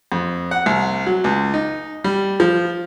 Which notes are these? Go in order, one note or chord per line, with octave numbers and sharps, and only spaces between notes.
F2
F#5
C2
F#3
C#2
D#4
G3
F3